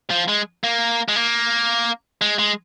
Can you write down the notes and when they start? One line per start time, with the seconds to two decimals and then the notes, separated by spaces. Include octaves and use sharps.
0.10 F3
0.28 G#3
0.64 A#3
1.08 G#3
1.16 A#3
2.22 G#3
2.39 G#3